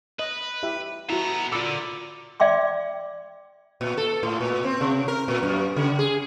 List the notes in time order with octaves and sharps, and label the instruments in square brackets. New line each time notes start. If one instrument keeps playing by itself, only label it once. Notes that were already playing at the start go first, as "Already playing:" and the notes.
[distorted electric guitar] B4 [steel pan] D#5
[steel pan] E4 G4 E5
[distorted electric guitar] B3 A4 [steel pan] E4 F#4 [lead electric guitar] G#4 A#5
[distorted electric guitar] A#2 [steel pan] F4 B5 D6 [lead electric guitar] A4 D5
[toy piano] D5 E5 G5 C6 D6
[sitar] A#2
A4
A2
A#2
C4
C3
A#4
A#2
F#2
C#3
G#4